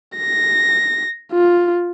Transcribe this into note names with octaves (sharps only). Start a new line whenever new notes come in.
A#6
F4